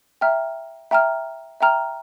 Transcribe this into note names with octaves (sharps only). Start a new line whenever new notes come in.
E5 G5 A#5 F6
E5 G5 A#5 F6
E5 G5 A#5 F6